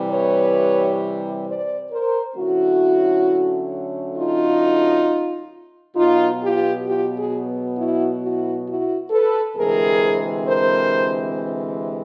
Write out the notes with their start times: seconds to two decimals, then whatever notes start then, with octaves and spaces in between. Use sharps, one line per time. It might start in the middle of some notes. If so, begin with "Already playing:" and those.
Already playing: C3 E3 G3
0.11 B4 C#5
1.46 C5 D5
1.91 A#4 C5
2.36 D3 F#3 A3 C#4 E4 F#4
4.16 D#4 F4
5.96 B2 F#3 B3 D#4 F4
6.41 F4 G4
6.86 F4 G4
7.16 F#4 G#4
7.76 E4 F#4
8.22 E4 F#4
8.67 E4 F#4
9.11 A4 B4
9.56 D2 C3 E3 G#3 C4 G#4 A#4
10.47 A#4 C5